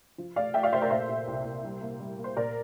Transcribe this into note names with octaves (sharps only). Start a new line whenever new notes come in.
F3
A3 D5 F5
A3 E5 G5
D5 F5
A3 C5 E5
A#4 D5
A#2 C5 E5
A#2
C2
C2
G3
A#3
G3
A#3
C5
A#2 A#4 D5